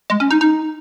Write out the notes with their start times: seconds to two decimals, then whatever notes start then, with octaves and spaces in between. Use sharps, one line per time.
0.10 G#3
0.20 C#4
0.31 D#4
0.41 D#4